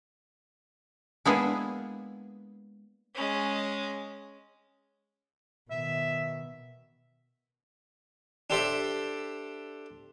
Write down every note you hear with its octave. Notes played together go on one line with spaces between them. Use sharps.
G#3 A#3 B3 D4 E4 G#4
G#3 C#4
B2 D#3 E5
D4 G4 A4 C5 D5 E5